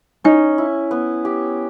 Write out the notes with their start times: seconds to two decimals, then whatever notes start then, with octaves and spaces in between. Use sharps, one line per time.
0.24 C#4 D#4
0.58 E4
0.91 B3
1.25 G4